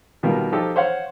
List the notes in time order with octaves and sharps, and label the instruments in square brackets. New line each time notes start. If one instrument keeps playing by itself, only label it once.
[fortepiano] B2 D#3 G3 F4 A#4
F3 D#4 F4 G4 A4
C5 C#5 F5 F#5